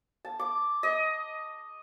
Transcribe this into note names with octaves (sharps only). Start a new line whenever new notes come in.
A5
D6
D#5